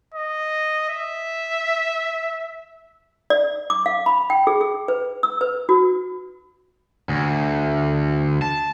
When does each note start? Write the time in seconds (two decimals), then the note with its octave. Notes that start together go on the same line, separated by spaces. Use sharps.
0.14 D#5
0.90 E5
3.30 D5
3.70 D6
3.86 F5
4.06 B5
4.30 G5
4.47 G#4
4.61 G#4
4.88 B4
5.23 E6
5.41 B4
5.69 F#4
7.09 D2
8.42 A5